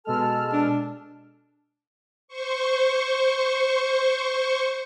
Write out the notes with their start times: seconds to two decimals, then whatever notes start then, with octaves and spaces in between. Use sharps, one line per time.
0.05 B2 G#3 A4 A5 F6
0.53 D4
2.28 C5 C#6